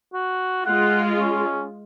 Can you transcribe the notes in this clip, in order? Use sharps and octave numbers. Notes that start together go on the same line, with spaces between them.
F#4
G#3 F4 F#5
C#4